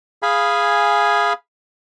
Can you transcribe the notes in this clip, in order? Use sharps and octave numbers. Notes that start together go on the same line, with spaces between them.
G#4 F5 G#5 B5